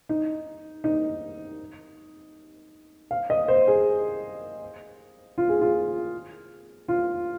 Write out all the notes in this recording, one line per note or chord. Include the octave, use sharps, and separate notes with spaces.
D#4
D#4
F5
D#5
C5
G#4
F4
G#4
F4
F4